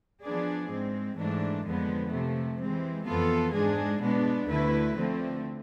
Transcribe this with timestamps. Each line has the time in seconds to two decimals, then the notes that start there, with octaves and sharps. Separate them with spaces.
0.23 F3 B3 D4 G#4 D5
0.70 G#2 G#3 C4
1.16 G#2 E3 A3 D4
1.64 F2 D3 F3 G#3 B3
2.11 C3 F3 A3
2.58 E3 G#3 C4
3.06 F2 E3 B3 F4 A4
3.53 G#2 G#3 D4 G#4
4.01 B2 G#3 B3 D4
4.48 D2 D3 A3 E4 B4
4.96 D3 F3 A3 C4